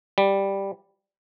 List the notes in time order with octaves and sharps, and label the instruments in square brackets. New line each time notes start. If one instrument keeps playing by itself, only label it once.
[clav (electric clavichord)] G3